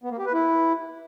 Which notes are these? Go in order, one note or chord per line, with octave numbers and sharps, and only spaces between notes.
B3
A#3
G4
B4
E4